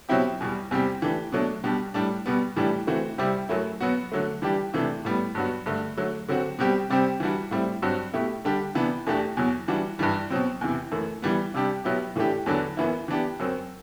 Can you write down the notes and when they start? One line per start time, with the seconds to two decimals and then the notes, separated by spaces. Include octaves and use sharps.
0.09 B2 F#3 C4 E4 G4
0.41 E2 B2 G3
0.71 E2 C3 G3 C4 G4
1.02 E3 A3 D4 G4
1.32 B2 F#3 A3 D4
1.64 B2 G3 D4 G4
1.94 A2 G3 D4
2.26 B2 G3 B3
2.56 A2 E3 G3 D4 G4
2.87 E3 A3 C4 F#4
3.18 C3 G3 C4 E4 G4
3.49 F#2 F#3 A3 E4
3.80 B2 F#3 B3 F#4
4.12 D3 F#3 A3
4.42 E3 G3 D4 G4
4.74 C3 E3 A3 D4
5.05 A2 G3 B3
5.35 G2 F#3 B3 F#4
5.66 G2 D3 A3
5.97 D3 F#3 A3
6.28 D3 F#3 C4 F#4
6.59 B2 G3 C4 G4
6.90 C3 G3 C4 G4
7.20 E3 G3 D4 F#4
7.51 A2 G3 C4 E4
7.82 G2 F#3 C4 F#4
8.14 B2 A3 E4 G4
8.45 D3 G3 D4 G4
8.75 C3 E3 B3 D4
9.06 E2 B2 A3 D4 G4
9.37 E2 B2 F#3
9.68 E3 G3 D4 F#4
9.99 G2 E3 G3
10.30 B2 F#3 C4
10.61 E2 C3 E3
10.91 F#2 E3 A3
11.22 E3 G3 B3
11.54 C3 G3 D4 G4
11.84 B2 F#3 B3 E4 G4
12.16 A2 E3 A3 D4 G4
12.46 E2 D3 F#3 B3 D4
12.77 F#2 E3 B3 E4
13.08 E3 B3 D4 G4
13.39 F#2 F#3 C4